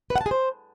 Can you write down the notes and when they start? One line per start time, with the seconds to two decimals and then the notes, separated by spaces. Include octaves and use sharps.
0.10 B4
0.16 F#5
0.21 A5
0.26 G#4
0.31 C5